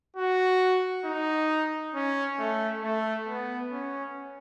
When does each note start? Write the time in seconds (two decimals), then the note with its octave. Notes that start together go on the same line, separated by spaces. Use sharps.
0.16 F#4
1.05 D#4
1.94 C#4
2.39 A3
2.83 A3
3.28 B3
3.72 C#4